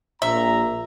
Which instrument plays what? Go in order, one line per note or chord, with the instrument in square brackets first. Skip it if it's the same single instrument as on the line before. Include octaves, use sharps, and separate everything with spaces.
[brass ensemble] A#1 A#2 A#5 [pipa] E5